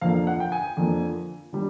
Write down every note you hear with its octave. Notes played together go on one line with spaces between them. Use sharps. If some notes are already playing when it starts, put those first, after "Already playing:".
F2 D3 F3 A#3 F5
F#5
G5
G#5
F2 D3 F3 A#3
D3 G3